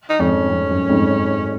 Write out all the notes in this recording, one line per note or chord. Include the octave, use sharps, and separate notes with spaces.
D#4
F2 G#2 C#4
F2
F#2
F2 G#2